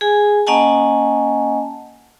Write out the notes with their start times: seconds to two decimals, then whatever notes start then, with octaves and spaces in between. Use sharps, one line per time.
0.01 G#4 G#5
0.47 A#3 C#4 D#5 F#5 G#5 A5